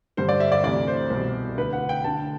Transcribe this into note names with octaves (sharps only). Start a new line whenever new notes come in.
G2 D3 C5
D5
E5
D5
D2 C3 E3 D5
C5
C2 B2
D2 D3 B4
F#5
G5
D2 D3 A5